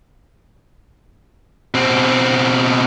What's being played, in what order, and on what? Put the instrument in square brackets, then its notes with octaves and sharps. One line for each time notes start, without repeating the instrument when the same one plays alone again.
[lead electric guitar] B2 C4